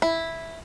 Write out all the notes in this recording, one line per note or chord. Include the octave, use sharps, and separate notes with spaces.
E4